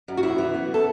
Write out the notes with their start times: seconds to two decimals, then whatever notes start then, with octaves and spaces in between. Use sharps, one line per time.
0.08 F#2
0.17 F#4
0.23 F#2 E4
0.38 E3
0.54 B3
0.74 A4